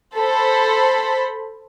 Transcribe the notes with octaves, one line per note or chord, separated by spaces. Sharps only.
A4 C5 B5